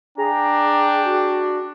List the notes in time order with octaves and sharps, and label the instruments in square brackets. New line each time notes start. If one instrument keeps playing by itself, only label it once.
[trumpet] D4 [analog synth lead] G#4 [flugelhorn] G5 [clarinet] A#5
[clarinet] F#4